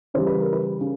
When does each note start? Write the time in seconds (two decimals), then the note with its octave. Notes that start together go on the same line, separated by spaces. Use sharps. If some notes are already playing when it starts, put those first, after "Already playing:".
0.14 C#3 E3 G3 C5
0.27 B4
0.40 A#4
0.53 B4
0.81 C#3